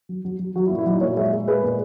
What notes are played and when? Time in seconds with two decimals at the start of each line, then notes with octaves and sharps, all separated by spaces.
0.09 F#3
0.25 F#3
0.39 F#3
0.56 F#3 F#4
0.67 E4
0.71 A#2
0.79 E4
0.86 F#3 D#4
1.01 A#2 C#5
1.17 G#3 E5
1.32 G#3
1.48 G#3 B4
1.63 A#2